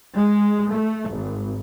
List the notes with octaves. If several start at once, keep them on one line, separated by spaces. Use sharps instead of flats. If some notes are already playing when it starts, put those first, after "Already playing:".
G#3
A3
G#1